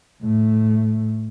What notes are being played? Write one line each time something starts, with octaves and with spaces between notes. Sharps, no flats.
A2 A3